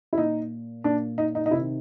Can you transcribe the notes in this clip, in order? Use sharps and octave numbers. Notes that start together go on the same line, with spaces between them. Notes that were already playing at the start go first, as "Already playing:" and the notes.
E4
A#2 D#4
A#2 D4
D#4
D#4
D#4
C3 D#3 E4